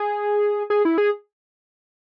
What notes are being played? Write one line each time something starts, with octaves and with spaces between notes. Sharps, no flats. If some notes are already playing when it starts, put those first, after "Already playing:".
Already playing: G#4
G#4
E4
G#4